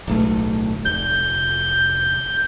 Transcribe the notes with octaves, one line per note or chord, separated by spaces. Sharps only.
D1 B1 A3
F1 G6